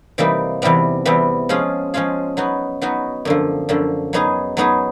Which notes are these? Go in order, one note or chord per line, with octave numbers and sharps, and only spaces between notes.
C3 E3 G3 A#3 D#4
E2 C3 E3 G3 B3
E2 C3 E3 G3 B3
F3 G#3 C#4 F4 G#4
F3 G#3 C#4 F4 G#4
F#3 B3 D#4 F#4
F#3 B3 D#4 F#4
F#2 D3 F3
F#2 D3 F3
F#3 B3 D#4 G#4
F#3 B3 D#4 G#4